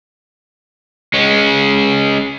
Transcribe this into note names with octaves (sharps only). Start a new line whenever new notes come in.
G#3 C#4